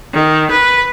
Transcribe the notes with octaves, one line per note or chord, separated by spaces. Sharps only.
D#3
B4